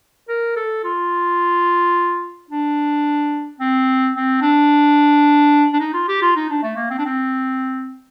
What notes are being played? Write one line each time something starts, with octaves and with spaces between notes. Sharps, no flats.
A#4
A4
F4
D4
C4
C4
D4
D4
D#4
F4
G4
F4
D#4
D4
A3
A#3
C4
D4
C4